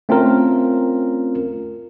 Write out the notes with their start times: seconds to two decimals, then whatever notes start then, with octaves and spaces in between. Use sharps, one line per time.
0.09 A3 C4 C#4 F4 A#4